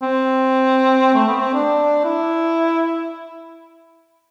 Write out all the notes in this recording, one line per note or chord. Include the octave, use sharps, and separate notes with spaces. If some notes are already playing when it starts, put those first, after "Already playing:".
C4
A3
B3
C4
D4
E4